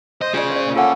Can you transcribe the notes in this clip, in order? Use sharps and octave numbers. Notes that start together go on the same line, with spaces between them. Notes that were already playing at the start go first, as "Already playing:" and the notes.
C5 D#5
C#4 F4 G#4 D5
C5 D5
A#2
A#3 C#4 F4 A4 F#5